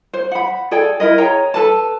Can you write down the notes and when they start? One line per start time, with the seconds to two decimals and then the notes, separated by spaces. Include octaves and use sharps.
0.13 C5
0.31 F#5 B5
0.71 G#4 A4 D5 G5
1.00 E4 A#4 B4 D#5
1.18 G#4 C#5 G5 A#5
1.54 A4 B4 A5